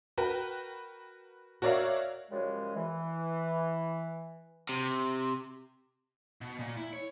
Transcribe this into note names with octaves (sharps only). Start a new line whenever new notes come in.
F#4 A#4 B4 G5
F#4 A#4 C#5 D5 E5 F5
F#2 C#3 F3 G3 G#3
E3
C3
B2
A#2
E4
C#5